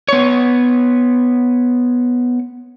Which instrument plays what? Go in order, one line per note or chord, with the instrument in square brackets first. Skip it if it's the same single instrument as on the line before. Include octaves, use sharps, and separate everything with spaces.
[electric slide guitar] B3 C#5